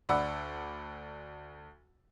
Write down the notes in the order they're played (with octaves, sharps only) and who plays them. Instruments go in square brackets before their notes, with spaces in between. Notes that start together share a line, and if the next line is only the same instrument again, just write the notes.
[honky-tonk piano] D2 D5 F#5 B5 E6